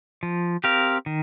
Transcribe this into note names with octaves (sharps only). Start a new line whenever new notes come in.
F3
C4 G4 A#4 F5
D#3